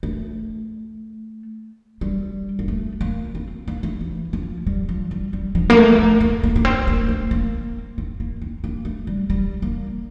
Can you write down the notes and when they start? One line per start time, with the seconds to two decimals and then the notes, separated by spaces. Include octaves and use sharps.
0.03 A3
2.01 G3
2.59 A#3
2.68 A3
3.01 A#3
3.35 C4
3.68 A#3
3.83 A3
4.01 E3
4.33 F3
4.67 G3
4.89 F3
5.11 G3
5.33 G3
5.55 F3
5.70 A#3
5.77 A3
5.99 A3
6.21 A#3
6.43 A#3
6.56 A#3
6.65 C4
6.87 A#3
7.09 A3
7.31 A#3
7.98 C4
8.20 A#3
8.42 C4
8.64 A#3
8.85 A3
9.07 G3
9.30 G3
9.62 A#3